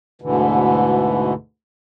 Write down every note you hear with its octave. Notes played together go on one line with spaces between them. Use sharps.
D2 G#2 B2 D3 E3